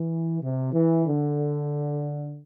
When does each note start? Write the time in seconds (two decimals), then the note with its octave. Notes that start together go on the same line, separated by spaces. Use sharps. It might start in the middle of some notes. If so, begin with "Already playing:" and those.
Already playing: E3
0.42 C3
0.73 E3
1.06 D3